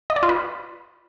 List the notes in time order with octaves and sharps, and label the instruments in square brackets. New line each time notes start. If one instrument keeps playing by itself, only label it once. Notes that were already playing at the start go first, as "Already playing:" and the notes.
[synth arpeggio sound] D#5
D5
F4
B4